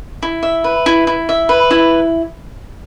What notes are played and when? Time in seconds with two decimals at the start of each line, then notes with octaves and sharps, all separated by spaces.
0.23 E4
0.43 E5
0.64 B4
0.86 E4
1.07 E4
1.29 E5
1.49 B4
1.71 E4